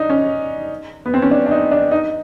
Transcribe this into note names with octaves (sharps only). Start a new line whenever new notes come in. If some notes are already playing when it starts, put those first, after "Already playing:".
Already playing: D4 D#4
C#4
B3
C4
C#4
D4
D4
D#4
D4
D#4